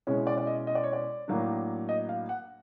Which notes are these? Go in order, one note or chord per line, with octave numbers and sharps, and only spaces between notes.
B2 G#3 C#4 E4 C#5
D5
D5
D#5
D#5
D5
C#5
D5
A2 F#3 A#3 D4
D#5
F5
F#5